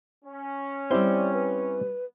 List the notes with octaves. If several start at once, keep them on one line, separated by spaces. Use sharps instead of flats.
C#4
G3 C4 E4 G4 C5 D5
B4